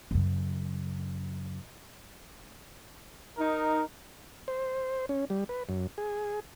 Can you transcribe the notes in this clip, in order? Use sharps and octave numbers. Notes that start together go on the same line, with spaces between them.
F#2 C#3
D#4 A#4
C5
C#4
G3
B4
F#2
G#4